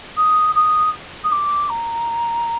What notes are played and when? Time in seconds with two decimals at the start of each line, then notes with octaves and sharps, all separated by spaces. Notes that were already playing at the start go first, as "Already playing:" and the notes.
0.17 D#6
0.55 D#6
1.24 D#6
1.32 D6
1.69 A#5